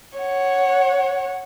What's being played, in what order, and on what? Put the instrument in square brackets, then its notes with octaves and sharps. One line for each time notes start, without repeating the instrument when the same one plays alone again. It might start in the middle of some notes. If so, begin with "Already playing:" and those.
[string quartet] C#5 F#5